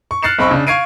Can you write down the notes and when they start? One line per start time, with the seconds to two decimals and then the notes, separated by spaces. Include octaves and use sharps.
0.11 C#6
0.23 F6 F#6 A6 C7 C#7 E7
0.39 B1 C4 B5 C#6 E6
0.51 C#3 D4
0.67 F5 C#6 G#6 C7 D7 D#7